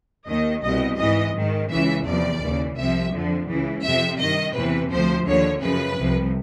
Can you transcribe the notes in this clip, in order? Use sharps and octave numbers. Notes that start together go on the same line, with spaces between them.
D#2 D#3 D#5
C2 B2 D#5
G#2 E3 D#5
G#2 D#3
C#2 C#3 E3 E5
E2 C3 F3 D5
D#2 C#3 E3
C2 C3 F3 E5
F2 D3 F3
C#2 C#3 E3
F2 C3 F3 E5
G2 D#3 D#5
E2 C3 E3 B4
D2 C3 F3 C5
D#2 D3 F3 C#5
F#2 C#3 F3 B4
C2 C3 F3